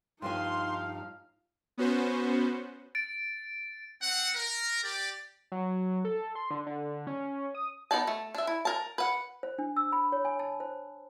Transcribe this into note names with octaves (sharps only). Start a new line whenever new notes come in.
G2 F3 D#4 F5 G#5 C6
B3 C#4 F#4 B4 C5
A6 D7
C4 F#5
A#4
G4 D5
F#3
A4
C6
D3
D3
C#4
D#6
B3 D#4 D5 A5
A3
D4 E5
E4
A#4 A5
B4 F#5
C5
D4
E6
B5
C#5
G#5
A5
C5